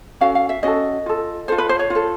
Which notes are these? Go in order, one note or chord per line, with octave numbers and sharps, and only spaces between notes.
C#4 F#4 A4 F5
F5
E5
C#4 F#4 A4 D#5
F4 A4
F4 A4 C5
B4
C5
C#5
F4 A4